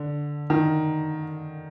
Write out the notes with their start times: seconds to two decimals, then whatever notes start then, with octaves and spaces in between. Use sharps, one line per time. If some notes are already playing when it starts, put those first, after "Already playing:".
Already playing: D3
0.50 D#3